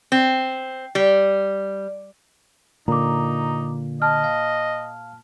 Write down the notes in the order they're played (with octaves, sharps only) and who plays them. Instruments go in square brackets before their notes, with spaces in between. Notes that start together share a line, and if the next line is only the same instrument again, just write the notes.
[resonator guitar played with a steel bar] C4
G3
[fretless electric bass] A#2 [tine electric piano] D3 [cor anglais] D#4 [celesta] A#5 D6
[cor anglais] D#5 [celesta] A5 F6
[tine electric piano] F5